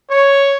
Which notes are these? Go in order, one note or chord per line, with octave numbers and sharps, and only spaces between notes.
C#5